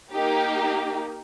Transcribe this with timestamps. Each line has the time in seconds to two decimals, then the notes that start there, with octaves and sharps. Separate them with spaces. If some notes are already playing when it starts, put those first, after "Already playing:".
0.10 A#3 D#4 G4